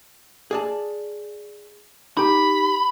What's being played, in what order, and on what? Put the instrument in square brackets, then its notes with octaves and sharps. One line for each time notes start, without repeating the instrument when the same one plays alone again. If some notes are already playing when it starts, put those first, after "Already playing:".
[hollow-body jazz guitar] G#4 D5 A5
[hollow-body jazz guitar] D#4 G4 [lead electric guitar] B5